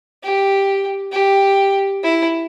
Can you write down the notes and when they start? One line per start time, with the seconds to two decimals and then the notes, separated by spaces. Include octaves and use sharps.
0.23 G4
1.12 G4
2.03 E4